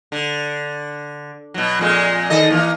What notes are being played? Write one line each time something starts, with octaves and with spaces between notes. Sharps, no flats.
D3
B2 F#3
F2 A#2 G#3
D#3 A4 D#5
E3 A#3